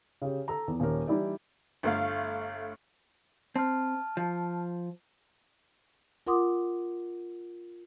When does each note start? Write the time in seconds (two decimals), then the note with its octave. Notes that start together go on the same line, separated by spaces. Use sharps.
0.22 C#3 G4
0.48 A4 A#5
0.68 E2
0.80 D#1 C#4 A#4
1.07 E3 G3 D#4 E4 G4 D5
1.83 G1 A3 F5
3.56 C4 A5 F6
4.17 F3
6.27 F4 A#4 F#5 C6 D6 D#6